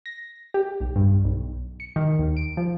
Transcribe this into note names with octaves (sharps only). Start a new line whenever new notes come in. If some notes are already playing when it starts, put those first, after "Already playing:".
A#6
G4
B1
G2
B1
C#7
D#3
D#2
D7
F3